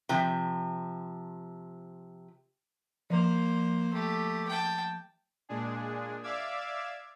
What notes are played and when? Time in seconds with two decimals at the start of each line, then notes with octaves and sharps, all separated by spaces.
0.09 C3 F3
3.10 F3 A#3 C5
3.93 A3 G4
4.48 G5 A5
5.49 A#2 G#3 D4 G#4
6.23 D5 E5 F5 D6 E6 G#6